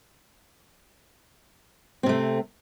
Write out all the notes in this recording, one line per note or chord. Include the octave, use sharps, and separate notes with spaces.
C3 A3 C4